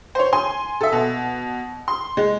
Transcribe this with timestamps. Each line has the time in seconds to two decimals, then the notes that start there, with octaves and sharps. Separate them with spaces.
0.15 C5 C#5
0.33 G#5 C6
0.81 A4 E5
0.92 B2
1.88 C6
2.17 G#3